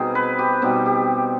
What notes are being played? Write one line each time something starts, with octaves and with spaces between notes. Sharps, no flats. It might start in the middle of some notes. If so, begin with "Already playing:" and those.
Already playing: B2 G3 C4 D#4 G#4
B4
G4
B2 G3 C4 D#4 G4
G4